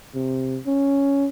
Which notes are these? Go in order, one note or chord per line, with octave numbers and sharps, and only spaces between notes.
C3
C#4